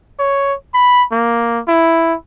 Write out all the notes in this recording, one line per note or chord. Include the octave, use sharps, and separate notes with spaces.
C#5
B5
A#3
E4